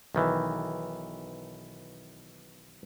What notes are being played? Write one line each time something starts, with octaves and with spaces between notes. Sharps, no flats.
B1 D#3 E3